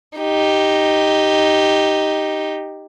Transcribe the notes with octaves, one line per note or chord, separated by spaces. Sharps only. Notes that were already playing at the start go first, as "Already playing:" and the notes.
D#4 G4